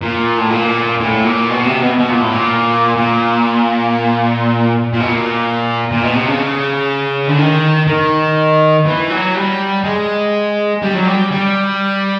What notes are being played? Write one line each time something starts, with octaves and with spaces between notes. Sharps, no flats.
A#2
A2
A#2
A2
A#2
B2
C3
B2
B2
A#2
A2
A#2
A#2
A#2
B2
A#2
A#2
B2
C3
C#3
D3
D#3
D#3
E3
F#3
G3
G#3
G3
F#3
G3
G3